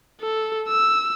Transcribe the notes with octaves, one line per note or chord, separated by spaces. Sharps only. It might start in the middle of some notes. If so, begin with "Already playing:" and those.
A4
E6